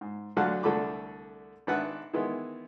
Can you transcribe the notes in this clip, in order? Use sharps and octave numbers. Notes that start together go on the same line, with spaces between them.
G#2
D2 D3 F#3 F5 F#5 A5
C2 D3 A3 A4 B5 D6
G#1 D4 B4 E5 F#5
D#3 E3 G#3 B3 E4